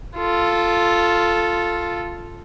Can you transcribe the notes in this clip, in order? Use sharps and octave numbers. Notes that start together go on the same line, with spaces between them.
F4 A4